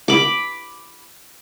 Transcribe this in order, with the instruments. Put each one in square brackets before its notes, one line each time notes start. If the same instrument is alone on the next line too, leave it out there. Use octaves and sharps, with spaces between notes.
[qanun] B5 D6